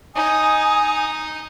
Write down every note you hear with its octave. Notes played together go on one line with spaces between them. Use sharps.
D#4 G#5 D#6